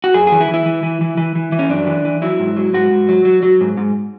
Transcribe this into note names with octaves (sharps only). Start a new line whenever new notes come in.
F#4
F#2 G#4
E3 G#4
E4
E3
E4
E3
E3
E3
E3
E3
E3
C#4
F#2 D4
E3
E3
F#3 E4
G#2
F#3
G#2 F#4
G#2
F#3
F#3
F#3
G#2
G#2